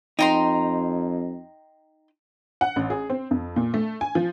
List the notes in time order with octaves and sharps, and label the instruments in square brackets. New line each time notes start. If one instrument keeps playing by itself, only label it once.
[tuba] F2 [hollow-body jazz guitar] D#4 [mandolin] G5 A#5 C6
[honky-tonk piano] F#5
A1
G#4
C4
F2
A#2
A3
G#5
F3